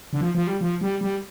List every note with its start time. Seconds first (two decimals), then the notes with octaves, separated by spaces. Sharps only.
0.13 D3
0.21 F3
0.35 F3
0.47 G3
0.61 F3
0.81 G3
1.01 G3